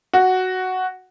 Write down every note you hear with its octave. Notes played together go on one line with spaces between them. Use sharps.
F#4